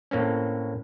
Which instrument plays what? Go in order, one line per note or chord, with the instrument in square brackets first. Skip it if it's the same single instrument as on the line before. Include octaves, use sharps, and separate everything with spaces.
[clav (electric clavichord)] A2 A#3 C4 C#4